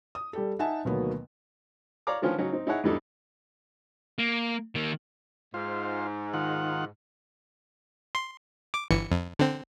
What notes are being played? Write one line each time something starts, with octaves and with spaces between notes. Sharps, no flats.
D#6
G3 G4 A4
D#4 E5 F#5 G#5 A5
D2 B2 D#3 F#3 A#3 B3
C#5 D5 F5 A#5 D6
D3 D#3 F3 C#4 F4 B4
C#3 F#3 C#4 D#4
C4 D#4
D#4 E4 G#4 C#5 F#5
E2 G#2 G3 D4 D#4 A4
A#3
D#3 A#3
G#2 F4 C5
D#3 F4 F#5
C6
D6
G1 E3 C#7
F2
D3 C4